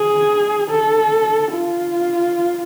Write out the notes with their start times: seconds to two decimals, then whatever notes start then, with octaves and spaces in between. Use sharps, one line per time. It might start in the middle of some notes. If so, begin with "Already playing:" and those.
Already playing: G#4
0.70 A4
1.52 F4